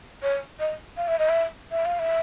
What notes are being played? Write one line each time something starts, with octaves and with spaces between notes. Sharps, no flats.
C#5
D#5
F5
E5
D#5
E5
E5
F5
E5